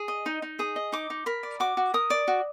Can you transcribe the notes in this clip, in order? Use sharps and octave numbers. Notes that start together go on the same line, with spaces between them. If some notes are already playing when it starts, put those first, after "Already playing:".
Already playing: G#4
D#5
D#4
D#4
G#4 D#6
D#5
D#4 D6
D#4
A#4 B5
D5
F#4 D6
F#4
A#4 D#6
D5
F#4